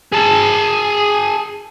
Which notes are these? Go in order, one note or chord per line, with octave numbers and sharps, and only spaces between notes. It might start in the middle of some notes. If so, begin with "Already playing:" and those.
G#4 A5